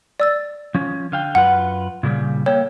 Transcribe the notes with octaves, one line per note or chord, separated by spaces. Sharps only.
D5 E6 A6
F3 C#4
D3 F5 G5
F#2 F4 B4 F#5
A#2 C#3 G3
A#3 A4 C#5 G5